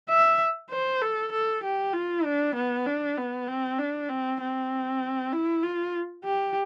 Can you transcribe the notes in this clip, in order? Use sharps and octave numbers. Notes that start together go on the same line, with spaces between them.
E5
C5
A4
A4
G4
F4
D4
B3
D4
B3
C4
D4
C4
C4
E4
F4
G4